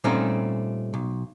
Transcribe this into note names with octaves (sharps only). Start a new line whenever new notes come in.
A#2 G3 A3 C4 C#4 D#4
B1